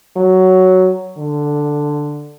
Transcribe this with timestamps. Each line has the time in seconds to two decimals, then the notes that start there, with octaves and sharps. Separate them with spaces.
0.16 F#3
1.18 D3